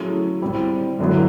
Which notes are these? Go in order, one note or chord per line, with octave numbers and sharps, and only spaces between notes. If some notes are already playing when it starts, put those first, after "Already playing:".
Already playing: F#3 A3 C#4 E4 G#4
G3 C4 E4
F#2 D3 F#3 B3 E4